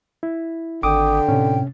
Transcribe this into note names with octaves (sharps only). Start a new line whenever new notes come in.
E4
G#1 D3 G5 D6 D#6
A2 C3 C#4